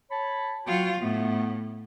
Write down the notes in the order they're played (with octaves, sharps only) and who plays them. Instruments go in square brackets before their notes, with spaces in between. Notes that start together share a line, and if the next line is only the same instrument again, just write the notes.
[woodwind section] C#5 A5 B5
[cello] F#3 F4 [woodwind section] F#4 G5
[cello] A2 [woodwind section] A3 B3